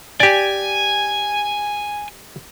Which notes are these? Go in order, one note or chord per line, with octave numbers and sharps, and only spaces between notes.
G4 D5 G#5